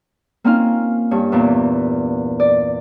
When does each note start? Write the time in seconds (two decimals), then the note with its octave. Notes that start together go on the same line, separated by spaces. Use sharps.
0.44 A#3 C4 C#4 D#4 F4 F5
1.11 G2 C#5
1.32 E2 A#2 E3
2.40 D5